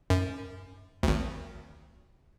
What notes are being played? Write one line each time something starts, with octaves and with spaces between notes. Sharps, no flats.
F#2
G#1 D2